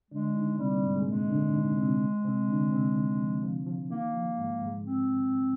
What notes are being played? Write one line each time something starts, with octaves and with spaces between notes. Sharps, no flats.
D3 G#3 D4
D#3 D#4
C3 G3 C4
A#3
G#2 G#3
G#3
A#2 G#3 A#3
D3 D4
D#3 D#4
C3 C4
C3 C4
D3 D4
C3 C4
D#3
F3
F3
F3
D#3 A#3
F3
G#2 G#3
G#2 G#3
C4